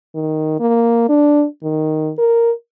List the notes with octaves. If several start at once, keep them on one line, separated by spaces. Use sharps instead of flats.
D#3
A#3
D4
D#3
A#4